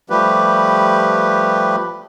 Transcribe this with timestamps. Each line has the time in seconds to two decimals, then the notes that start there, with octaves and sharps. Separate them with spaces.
0.10 F3 G3 A3 G4 B4